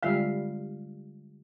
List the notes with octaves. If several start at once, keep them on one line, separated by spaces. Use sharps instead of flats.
D3 G3 G#3 F4 E5 F5